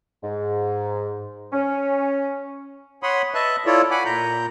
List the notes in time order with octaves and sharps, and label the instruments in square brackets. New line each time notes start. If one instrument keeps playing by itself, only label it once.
[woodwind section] G#2
C#4
[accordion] C#5 F#5 B5 C6 D#6
B4 D#5 E5 A5 F#6
E4 F4 A4 C#5 D5
F#5 G#5 B5 D6
A#2 A#5 G6